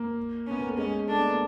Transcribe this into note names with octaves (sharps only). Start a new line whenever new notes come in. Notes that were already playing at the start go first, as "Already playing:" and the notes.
Already playing: A#3
B3 C#4
A#3
A3
G#3 C#4
A3 D4
B3
A#3